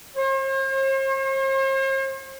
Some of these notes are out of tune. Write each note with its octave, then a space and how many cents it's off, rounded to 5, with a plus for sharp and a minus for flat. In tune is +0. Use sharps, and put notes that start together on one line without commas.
C5 +45